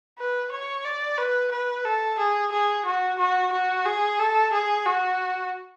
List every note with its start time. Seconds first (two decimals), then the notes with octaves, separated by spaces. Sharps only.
0.19 B4
0.52 C#5
0.85 D5
1.18 B4
1.52 B4
1.85 A4
2.19 G#4
2.52 G#4
2.86 F#4
3.19 F#4
3.52 F#4
3.86 G#4
4.19 A4
4.53 G#4
4.86 F#4